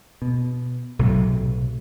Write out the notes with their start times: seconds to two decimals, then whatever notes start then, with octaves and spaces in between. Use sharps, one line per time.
0.22 B2
0.99 B1 A2 C3 F#3